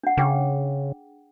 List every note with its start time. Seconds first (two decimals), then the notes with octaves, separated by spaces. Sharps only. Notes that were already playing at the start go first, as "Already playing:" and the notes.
0.03 D4 F#5
0.17 C#3 D4 G#4 G5